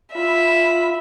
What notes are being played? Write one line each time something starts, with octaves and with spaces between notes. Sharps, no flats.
F4 E5 B5